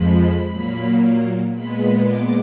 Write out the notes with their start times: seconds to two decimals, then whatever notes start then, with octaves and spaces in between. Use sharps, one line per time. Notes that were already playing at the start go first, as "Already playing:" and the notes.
Already playing: F2 F3 G#3 B5
0.51 A#2 F#3 A#3
1.51 A#2 G#3 B3 B5
2.01 D6